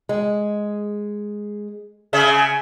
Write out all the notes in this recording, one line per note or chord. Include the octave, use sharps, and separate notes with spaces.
G#3
C#3 G#4 E5